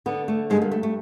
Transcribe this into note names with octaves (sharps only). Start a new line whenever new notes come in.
D3 B3
A3
G2 G#3
A#3
A3
A3